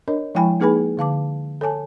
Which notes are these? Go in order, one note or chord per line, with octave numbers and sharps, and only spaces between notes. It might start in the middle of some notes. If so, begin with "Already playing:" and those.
D4 A#4 C#5 D#5
F3 G#3 E4 G5 G#5 B5
A#3 D#4 G#4 B4 G#5 B5
D3 F5 A5 D6
A4 C#5 G#5 A5